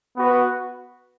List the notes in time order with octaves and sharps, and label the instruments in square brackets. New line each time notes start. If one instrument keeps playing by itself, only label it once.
[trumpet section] B3 F#4 B4